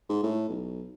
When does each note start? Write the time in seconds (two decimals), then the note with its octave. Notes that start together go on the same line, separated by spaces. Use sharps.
0.09 G#2
0.23 A2
0.49 B1